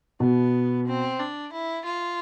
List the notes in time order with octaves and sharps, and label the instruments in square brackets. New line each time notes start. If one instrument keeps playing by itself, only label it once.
[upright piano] B2 [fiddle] B3
[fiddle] C4
D4
E4
F4